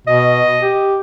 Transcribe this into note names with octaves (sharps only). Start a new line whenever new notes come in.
B2 D#5
G4